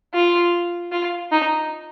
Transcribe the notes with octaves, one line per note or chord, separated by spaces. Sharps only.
F4
F4
D#4